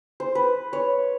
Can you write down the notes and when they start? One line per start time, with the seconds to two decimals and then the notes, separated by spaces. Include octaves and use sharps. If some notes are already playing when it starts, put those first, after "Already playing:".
0.20 C5
0.35 B4
0.73 C#5